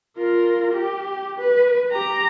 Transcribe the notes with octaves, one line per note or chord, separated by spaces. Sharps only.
F4 A#4
G4
B4
G4 A#5